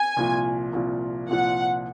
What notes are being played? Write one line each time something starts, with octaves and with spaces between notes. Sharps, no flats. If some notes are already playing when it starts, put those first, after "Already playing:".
Already playing: G#5
C2 A#2 F3
C2 A#2 F3
C2 A#2 F3 F#5